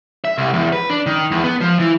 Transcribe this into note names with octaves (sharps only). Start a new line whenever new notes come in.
E5
C2
E2
B4
D4
D#3
E2
B3
F3
E3